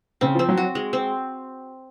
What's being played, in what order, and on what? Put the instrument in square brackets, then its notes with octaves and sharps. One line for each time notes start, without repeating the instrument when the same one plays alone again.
[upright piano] C#3 [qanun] C4
[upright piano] F3 [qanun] C4
[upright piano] F#3
[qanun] F#4
G#3
C4